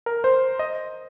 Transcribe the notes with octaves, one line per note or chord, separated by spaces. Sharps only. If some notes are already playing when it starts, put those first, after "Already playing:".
A#4
C5
D#5